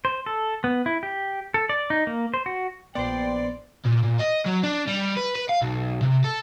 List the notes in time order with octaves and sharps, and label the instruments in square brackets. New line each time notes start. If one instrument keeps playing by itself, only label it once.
[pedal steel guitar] C5
A4
B3
E4
G4
A4
D5
D#4
A#3
C5
F#4
[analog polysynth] A#1 C6 [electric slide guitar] B3 C5 [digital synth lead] D5 [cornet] G5
[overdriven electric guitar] A#2
A#2
D#5
F#3
D4
G3
B4
B4
F5
B1
C3
A4